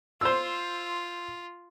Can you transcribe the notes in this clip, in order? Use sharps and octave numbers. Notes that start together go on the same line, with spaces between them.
F4 C5 E6